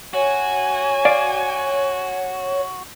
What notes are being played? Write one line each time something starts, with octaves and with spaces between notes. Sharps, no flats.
F#4 C#5 G#5
D5 F5